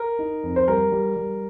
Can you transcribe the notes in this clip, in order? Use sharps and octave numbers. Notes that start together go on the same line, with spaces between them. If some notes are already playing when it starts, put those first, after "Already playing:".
Already playing: A#4
D#4
F2
C5
G3 A#4
G3
G3